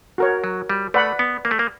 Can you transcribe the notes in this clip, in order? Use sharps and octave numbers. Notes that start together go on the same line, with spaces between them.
F#4 A#4 C#5
F#3
G3
A3 B4 D5 F#5 B5
B3
A#3
A3
A#3